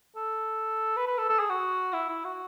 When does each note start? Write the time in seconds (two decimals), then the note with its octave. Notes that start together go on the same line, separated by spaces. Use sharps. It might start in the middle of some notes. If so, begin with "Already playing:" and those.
0.16 A4
0.97 B4
1.07 B4
1.18 A4
1.29 A4
1.39 G#4
1.50 F#4
1.93 E4
2.09 E4
2.25 F#4